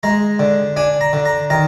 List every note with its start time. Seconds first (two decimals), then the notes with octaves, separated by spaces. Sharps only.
0.03 G#3 A#5
0.39 D3
0.77 D4 G#5
1.01 A#5
1.13 D3
1.25 A#5
1.50 D#3 A#5